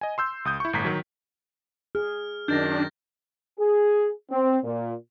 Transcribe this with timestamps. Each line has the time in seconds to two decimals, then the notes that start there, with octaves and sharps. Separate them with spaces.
0.01 D#5 G#5
0.18 C6 E6 G6
0.45 C#2 D#6 G6
0.60 E4 C#6
0.73 G1 A2 A#5 B6
0.85 D#3 F#3
1.95 G#4 F6
2.48 F#2 D#3 D4 G6 A6 A#6
3.59 G#4
4.30 C4
4.64 A#2